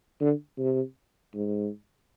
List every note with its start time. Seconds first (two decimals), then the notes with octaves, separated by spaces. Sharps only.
0.21 D3
0.58 C3
1.34 G#2